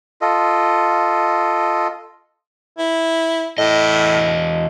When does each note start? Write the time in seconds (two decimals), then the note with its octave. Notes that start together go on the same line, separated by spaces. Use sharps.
0.21 F4 A4 D#5
2.78 E4
3.58 E2 A2 D#5